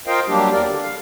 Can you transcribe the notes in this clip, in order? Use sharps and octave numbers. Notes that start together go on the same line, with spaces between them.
F4 A#4 C5 D#5 F5 G5
F#3 G3 A#3 D4 G4
E2 A#4 D5
D3
F5